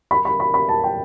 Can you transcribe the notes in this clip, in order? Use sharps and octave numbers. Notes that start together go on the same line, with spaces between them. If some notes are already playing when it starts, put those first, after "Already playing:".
B5
B5
B5
B5
A5
G5